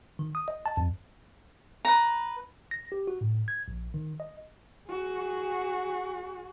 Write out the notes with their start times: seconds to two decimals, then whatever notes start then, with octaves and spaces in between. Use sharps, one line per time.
0.19 D#3
0.35 D#6
0.48 D#5
0.66 A5
0.77 F2
1.85 B4 A#5
2.71 A#6
2.92 G4
3.07 F#4
3.21 A2
3.48 G#6
3.68 A#1
3.94 D#3
4.20 D#5
4.90 F#4 G#4